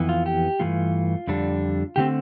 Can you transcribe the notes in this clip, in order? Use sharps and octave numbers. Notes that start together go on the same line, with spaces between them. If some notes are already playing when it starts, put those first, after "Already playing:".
Already playing: F2 E3 B3
F4
G4
G2 E3 A3 F4
F2 D3 G3 D4
D3 A3 C4 G4